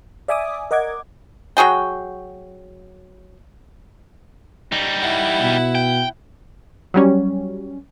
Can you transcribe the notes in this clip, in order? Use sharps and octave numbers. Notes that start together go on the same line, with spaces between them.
D5 E5 G#5 D6 D#6
A#4 D#5 F#5 D6 G#6
F#3 F#4 G#4 G5
G3 D#4
E4 F#5
B2
G5
F#3 G3 C#4